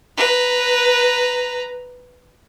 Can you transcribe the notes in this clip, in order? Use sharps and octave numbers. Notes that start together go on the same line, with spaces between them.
B4 A#5